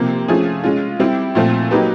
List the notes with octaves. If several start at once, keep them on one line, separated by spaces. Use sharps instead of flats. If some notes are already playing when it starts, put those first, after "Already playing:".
Already playing: C3 F3 A#3
F3 A3 C#4 F4 G#4
G#3 C#4 F4
G3 C4 E4 G4
A#2 F3 A3 C4 F4
F#3 A#3 D#4 G4 B4